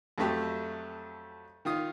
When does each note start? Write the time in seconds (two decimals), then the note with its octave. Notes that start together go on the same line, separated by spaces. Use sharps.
0.18 F2 F#3 A3 G4
1.65 D#3 F4 D#6